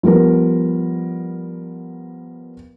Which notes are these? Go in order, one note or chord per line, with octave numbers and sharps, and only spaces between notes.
F3 G3 B3 A#4